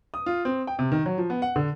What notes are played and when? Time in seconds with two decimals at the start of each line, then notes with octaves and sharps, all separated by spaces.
0.14 D#6
0.26 F4
0.45 C4
0.67 G5
0.79 C3
0.92 D#3
1.06 F#3
1.18 F3
1.30 B3
1.42 F#5
1.56 D3